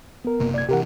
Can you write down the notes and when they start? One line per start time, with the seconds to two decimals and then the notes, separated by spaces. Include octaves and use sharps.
0.25 B3 A#4
0.40 F#1 C3 A#3
0.54 D5 G#6
0.69 C3 E3 G4 A#4 F#5